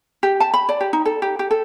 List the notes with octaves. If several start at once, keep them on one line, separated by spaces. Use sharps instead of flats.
G4
A5
B5
D5
G4
D#4
A4
G4
G4
A4